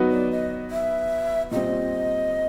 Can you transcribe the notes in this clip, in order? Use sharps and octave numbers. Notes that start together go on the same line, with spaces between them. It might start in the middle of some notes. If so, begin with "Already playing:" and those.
Already playing: F#3 B3 D#4 F#4 B4
D5
D#5
E5
A#2 G3 C4 D#5